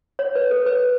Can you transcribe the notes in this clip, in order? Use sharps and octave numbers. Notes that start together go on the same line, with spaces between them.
C#5
B4
A4
B4